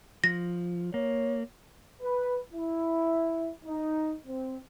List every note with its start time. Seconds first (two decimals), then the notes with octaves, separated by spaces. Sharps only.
0.24 F3 A#6
0.94 A#3 C#5
2.02 B4
2.53 E4
3.65 D#4
4.26 C4